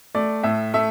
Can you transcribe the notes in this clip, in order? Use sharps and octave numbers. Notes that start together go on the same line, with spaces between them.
A3 D5
A2 E5
A3 E5